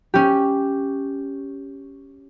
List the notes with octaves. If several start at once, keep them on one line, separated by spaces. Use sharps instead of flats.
C#4 G4